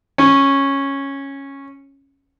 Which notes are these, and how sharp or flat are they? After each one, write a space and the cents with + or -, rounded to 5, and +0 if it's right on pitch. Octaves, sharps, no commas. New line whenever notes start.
C#4 -10